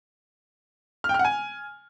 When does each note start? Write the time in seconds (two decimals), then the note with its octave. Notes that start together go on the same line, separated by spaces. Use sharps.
1.04 F6
1.09 G5
1.14 F6
1.19 F#5
1.24 G#5